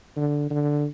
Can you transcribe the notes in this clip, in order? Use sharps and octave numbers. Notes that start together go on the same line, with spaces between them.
D3
D3